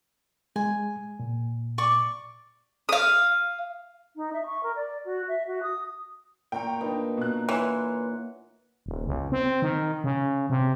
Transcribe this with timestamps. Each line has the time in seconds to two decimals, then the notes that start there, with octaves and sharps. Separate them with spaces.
0.56 G#3 G#5
1.19 A#2
1.78 D5 C#6 D6
2.89 F5 D#6
4.16 D#4
4.33 E5
4.46 C#6
4.63 A#4
4.75 D5
5.05 F#4
5.28 E5
5.47 F#4
5.63 D#6
6.52 A#2 G5 A#5 C#6
6.81 D4 D#4 A#4 B4
7.17 B2 F#6
7.49 E3 C#5 F#5 C6
8.86 D#1
9.06 C#2
9.32 C4
9.62 D#3
10.04 C#3
10.50 C3